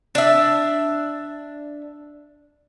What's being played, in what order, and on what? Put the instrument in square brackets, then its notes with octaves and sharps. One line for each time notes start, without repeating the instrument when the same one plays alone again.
[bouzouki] D4 E5